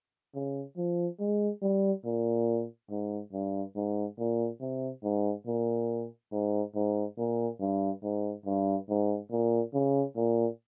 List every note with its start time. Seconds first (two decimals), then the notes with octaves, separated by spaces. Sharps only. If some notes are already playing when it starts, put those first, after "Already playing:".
0.35 C#3
0.77 F3
1.20 G#3
1.62 G3
2.05 A#2
2.91 G#2
3.33 G2
3.76 G#2
4.19 A#2
4.61 C3
5.03 G#2
5.47 A#2
6.32 G#2
6.75 G#2
7.18 A#2
7.60 G2
8.03 G#2
8.46 G2
8.89 G#2
9.31 A#2
9.74 C#3
10.17 A#2